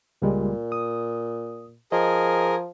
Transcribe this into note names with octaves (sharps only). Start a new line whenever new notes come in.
C#2 A#2 G3 G#3
D#6
F3 G#4 A#4 D#5